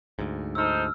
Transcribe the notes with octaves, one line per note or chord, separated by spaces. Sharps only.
D2 G#2
D#4 A4 C5 E6 F6